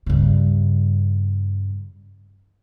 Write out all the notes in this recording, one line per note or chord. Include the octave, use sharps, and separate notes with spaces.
G2 C#3